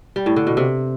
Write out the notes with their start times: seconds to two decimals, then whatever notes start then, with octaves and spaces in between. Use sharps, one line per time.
0.16 G3
0.26 A2
0.36 D3
0.47 B2
0.57 C3